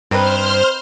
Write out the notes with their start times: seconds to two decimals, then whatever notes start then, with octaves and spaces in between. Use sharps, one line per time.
0.11 G2 C4 D#4 B4 C5 C6 F6